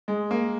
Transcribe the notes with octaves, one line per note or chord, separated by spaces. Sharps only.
G#3
A#3